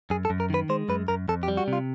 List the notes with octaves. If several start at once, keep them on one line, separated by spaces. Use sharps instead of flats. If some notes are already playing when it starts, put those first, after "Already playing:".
F#2 G#4
A4
F#2
A#4
D#3 B4
G#3 C5
F#2 B4
F#2 A#4
F2 A4
G4
G3
F#4
C3 F4